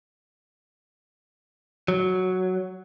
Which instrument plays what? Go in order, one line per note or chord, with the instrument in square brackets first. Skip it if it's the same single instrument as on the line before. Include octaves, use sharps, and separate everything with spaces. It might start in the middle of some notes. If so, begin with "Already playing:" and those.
[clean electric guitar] F#3